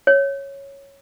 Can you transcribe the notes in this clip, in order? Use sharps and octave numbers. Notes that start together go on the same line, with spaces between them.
C#5